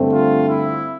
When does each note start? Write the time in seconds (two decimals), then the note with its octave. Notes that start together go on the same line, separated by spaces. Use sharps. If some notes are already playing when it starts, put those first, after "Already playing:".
Already playing: G2 D3 A3 C4
0.11 F4
0.47 E4